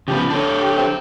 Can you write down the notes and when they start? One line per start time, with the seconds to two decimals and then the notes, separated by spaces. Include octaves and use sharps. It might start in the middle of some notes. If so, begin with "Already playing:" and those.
0.08 C#3 F3 B3 G4
0.30 D4 A4 C#5
0.77 C4